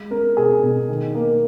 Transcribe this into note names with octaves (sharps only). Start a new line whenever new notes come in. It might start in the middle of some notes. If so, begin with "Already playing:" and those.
Already playing: G#3
C#4 A#4
B2 G#4
B2
D#3
A#3